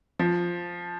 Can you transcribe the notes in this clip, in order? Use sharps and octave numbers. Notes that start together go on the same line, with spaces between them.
F3